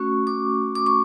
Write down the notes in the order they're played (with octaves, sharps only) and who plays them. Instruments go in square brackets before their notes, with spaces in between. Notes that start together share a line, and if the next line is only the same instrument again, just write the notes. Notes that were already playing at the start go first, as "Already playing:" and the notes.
Already playing: [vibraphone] A3 C#4 F#4 C#6
D6
D6
C#6